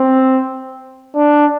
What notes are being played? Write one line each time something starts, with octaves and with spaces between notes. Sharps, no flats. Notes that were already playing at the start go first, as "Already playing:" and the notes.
Already playing: C4
D4